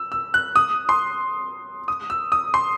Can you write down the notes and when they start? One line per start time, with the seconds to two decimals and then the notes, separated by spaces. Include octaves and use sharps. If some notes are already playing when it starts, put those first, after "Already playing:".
Already playing: E6
0.12 E6
0.34 F#6
0.56 D#6
0.89 C6
1.88 D#6
2.10 E6
2.32 D#6
2.54 C6